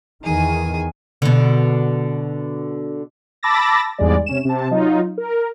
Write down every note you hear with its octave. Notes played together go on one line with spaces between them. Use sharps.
E2 D#3 G#4 G#5
B2 D3
A5 B5 D6 E6 A6 A#6
E2 G#2 G3 G#3 D5
C3 C#4 E7
C3 A5
F#3 D#4 F4
A#4